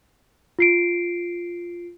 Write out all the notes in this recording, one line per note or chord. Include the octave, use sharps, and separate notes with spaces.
F4 C7 D7